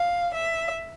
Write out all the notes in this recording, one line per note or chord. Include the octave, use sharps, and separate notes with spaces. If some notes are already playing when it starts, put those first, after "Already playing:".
Already playing: F5
E5